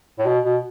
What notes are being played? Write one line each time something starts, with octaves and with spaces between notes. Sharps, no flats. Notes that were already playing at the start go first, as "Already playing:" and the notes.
A2
B2
B2